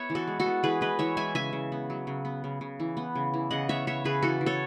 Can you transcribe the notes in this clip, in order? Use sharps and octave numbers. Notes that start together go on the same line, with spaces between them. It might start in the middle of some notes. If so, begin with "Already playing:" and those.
Already playing: B3 C#5 E5
E3
F#4 A4
G#3
F#4 A4
B3
E3 G#4 B4
G#3 B4 D#5
E3 C#5 E5
G#3 E5 G#5
C#3 E5 G#5
C#3
B3
F#3
C#3
B3
C#3
C#3
E3
B3
C#3
E3
C#3 D#5 F#5
B3 C#5 E5
C#3 C#5 E5
C#3 G#4 B4
E3 F#4 A4
E3
A4 C#5